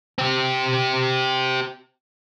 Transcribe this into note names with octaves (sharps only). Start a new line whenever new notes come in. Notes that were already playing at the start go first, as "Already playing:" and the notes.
C4 G4